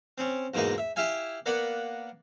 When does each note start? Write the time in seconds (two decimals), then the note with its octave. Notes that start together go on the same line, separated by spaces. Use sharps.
0.18 C4 C#4
0.54 E2 G#2 B2 A#3 D#4 D#5
0.78 E5
0.96 E4 G4 E5 F5 G#5
1.46 A#3 B3 D5 F#5 B5